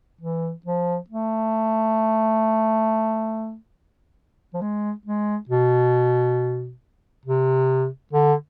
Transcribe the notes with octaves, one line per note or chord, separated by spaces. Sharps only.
E3
F3
A3
F3
G#3
G#3
B2
C3
D3